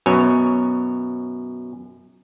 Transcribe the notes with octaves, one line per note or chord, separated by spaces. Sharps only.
F#2 B2 C#5